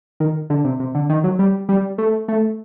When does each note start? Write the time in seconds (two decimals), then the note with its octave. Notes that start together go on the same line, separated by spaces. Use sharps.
0.20 D#3
0.50 D3
0.64 C3
0.80 C3
0.95 D3
1.09 D#3
1.24 F#3
1.39 G3
1.69 G3
1.98 A3
2.28 A3